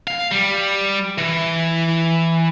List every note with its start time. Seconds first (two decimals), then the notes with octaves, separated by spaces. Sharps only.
0.07 F5
0.31 G3
1.18 E3